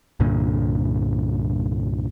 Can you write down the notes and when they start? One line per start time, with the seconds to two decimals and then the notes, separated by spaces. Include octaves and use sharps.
0.20 C2 G2 A#2 D3